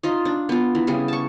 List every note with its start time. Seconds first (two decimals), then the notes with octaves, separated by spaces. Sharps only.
0.03 D#4 F4 D#5
0.25 D4
0.49 B3 F4
0.75 E3
0.87 C#3 G3 G#4
1.08 A5 C#6